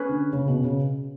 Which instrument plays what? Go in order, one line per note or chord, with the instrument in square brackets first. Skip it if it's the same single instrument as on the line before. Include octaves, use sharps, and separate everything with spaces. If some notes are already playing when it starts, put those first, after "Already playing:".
Already playing: [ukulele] C#4 G#4 B4
[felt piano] D3
C#3
B2
C#3